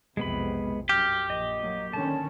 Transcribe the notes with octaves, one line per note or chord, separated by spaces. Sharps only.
B1 F2 C3 G#3 B3 B5
F#2 G4 F6
A#1 D#5
F#3 A#3
D3 D#3 C#4 A5